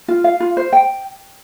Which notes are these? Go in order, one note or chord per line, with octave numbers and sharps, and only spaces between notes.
F4
F5
F4
C5
G5